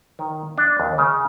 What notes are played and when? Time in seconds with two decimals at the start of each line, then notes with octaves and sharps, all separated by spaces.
0.19 D#3
0.58 D4
0.80 D#2
0.98 C#3